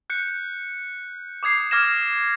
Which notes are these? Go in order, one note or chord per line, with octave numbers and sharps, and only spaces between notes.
F#6 G6 C#7
D6 D#6 G#6 C7
D6 F6 G#6 A#6 E7